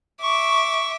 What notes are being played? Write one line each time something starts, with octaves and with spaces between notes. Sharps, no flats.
E5 C#6 D6